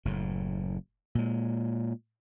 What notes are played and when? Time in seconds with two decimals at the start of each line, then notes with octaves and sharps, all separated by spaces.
0.05 F#1 A2
1.15 A#2 G#3